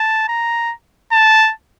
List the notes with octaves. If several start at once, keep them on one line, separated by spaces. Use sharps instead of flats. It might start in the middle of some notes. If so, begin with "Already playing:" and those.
Already playing: A5
A#5
A5